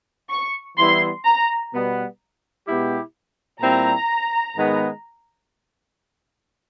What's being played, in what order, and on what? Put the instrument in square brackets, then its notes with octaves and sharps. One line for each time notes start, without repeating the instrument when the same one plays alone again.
[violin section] C#6
[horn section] E3 G3 B3 E4 [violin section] C6
[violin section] A#5
[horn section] B2 G3 B3
B2 G#3 B3 E4 G4
[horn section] A#2 G3 C4 E4 G4 [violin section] A#5
[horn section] G#2 D#3 G#3 B3